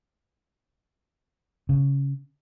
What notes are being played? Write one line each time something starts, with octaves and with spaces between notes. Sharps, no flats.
C#3